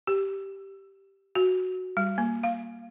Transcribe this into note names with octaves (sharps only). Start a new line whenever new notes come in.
G4
F#4
G3
A#3
F5